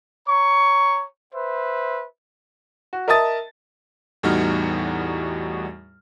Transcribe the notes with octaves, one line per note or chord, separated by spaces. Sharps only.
C#5 A#5 C#6
B4 C5 E5
F#4
A#4 D#5 E5 A5 D#6 A6
E2 A2 G3 D#4 F#4 F6